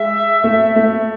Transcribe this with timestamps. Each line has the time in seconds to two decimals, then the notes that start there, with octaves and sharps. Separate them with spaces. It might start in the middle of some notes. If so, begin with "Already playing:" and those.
Already playing: G#3 E5
0.44 A3
0.76 A3